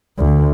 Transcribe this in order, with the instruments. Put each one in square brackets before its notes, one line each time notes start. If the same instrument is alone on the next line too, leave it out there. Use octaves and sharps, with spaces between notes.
[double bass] D2